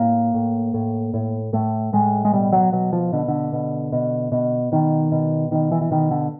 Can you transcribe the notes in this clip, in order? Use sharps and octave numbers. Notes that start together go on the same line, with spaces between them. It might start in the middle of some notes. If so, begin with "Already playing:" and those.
Already playing: A2 A#3
A2
A2
A2
A2 A3
A2 G#3
G#3
B2 G3
F#3
B2 F#3
F3
B2 D3
D3
B2
B2
B2
B2 D#3
B2
B2 D#3
E3
E3
B2 D#3
D3